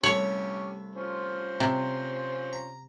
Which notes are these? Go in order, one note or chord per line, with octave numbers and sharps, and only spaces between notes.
C2 A3 C#4 G4 C#5 E5
C#4 F4 C5
C3
A#5